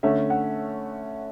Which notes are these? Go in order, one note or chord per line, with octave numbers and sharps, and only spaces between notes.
D3 A3 C#4 E5
F#5